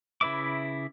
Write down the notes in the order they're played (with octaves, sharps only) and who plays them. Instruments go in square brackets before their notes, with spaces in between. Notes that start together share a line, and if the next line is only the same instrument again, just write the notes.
[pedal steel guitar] C#3 E4 B4 E5 D6